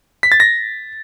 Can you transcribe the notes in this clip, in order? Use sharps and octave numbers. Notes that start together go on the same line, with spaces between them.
B6
A6
A#6